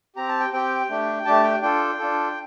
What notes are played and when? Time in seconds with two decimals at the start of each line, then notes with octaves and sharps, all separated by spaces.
0.16 C4 G4 A#5
0.29 A5
0.40 G5
0.53 C4 G4 G5
0.90 A3 D4 G4
1.25 A3 D4 G4 A5
1.43 G5
1.62 D4 F4 A4 G5
1.99 D4 F4 A4